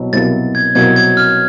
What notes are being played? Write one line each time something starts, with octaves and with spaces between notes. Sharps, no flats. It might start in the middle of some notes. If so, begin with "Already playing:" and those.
Already playing: C2 B2 F#3
C2 B2 F#3 A#3 A6
G#6
C2 B2 F#3 A#3 G#6
G#6
F6